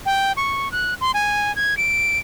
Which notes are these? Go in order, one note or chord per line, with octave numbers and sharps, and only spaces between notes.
G5
C#6
F#6
C6
G#5
G#6
D7